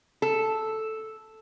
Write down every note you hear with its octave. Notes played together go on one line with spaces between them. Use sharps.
A4